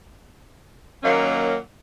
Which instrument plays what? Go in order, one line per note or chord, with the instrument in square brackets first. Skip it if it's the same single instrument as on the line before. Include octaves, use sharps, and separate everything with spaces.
[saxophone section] A#2 D#3 F#3 A#3 C#4